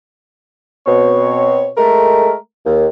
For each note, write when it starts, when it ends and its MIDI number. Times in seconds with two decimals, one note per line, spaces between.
0.86 1.68 47
0.86 1.68 60
0.86 1.68 73
1.77 2.33 56
1.77 2.33 57
1.77 2.33 70
2.66 2.86 39